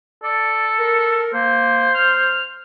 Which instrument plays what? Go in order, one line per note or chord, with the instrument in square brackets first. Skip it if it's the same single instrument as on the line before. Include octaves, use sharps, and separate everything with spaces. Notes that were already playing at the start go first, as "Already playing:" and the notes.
[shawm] A4 [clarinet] D5
[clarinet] A#4
[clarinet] A#3 [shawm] C5
[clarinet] F6